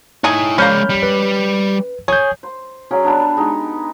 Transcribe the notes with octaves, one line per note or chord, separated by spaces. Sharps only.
D#4 E4 G#4 C#5
G#3 A#3 C#4 D5 B5 F6 G6
G3
B4
G#4 C#5 G6
C5
F#3 C#4 G#4 D5
G3 B3 D4
G#3 D#4 G4